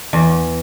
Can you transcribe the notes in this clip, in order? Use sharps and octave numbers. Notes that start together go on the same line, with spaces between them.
E2